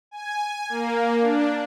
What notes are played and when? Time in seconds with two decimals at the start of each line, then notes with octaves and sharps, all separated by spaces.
0.11 G#5
0.69 A#3
1.21 D4